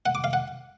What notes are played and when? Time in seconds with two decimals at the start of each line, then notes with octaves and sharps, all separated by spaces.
0.06 F#5
0.15 D6
0.24 F5
0.33 F#5